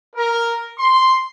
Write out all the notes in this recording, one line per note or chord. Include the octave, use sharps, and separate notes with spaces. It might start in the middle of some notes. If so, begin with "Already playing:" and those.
A#4
C6